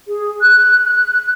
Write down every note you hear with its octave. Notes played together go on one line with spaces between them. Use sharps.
G#4
F#6
F#6